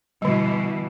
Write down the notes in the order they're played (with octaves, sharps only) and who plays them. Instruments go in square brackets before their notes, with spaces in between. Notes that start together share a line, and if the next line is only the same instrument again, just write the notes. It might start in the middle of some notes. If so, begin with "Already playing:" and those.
[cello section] B2 E3 [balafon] D3 G3